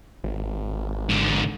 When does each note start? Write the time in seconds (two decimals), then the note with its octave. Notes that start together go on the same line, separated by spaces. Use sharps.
0.24 G#1
1.09 G#2 D3